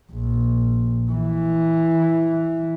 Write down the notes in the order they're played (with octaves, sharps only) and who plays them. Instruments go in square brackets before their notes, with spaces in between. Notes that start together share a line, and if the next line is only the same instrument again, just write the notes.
[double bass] A#1
E3